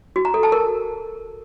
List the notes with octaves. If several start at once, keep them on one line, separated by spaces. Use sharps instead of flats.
F#4
A#5
A4
A5
A#4